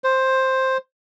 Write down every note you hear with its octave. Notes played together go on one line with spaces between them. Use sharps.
C5